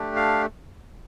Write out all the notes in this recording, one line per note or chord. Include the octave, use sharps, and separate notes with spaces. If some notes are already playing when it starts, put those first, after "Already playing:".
Already playing: A3 D4 G4
F5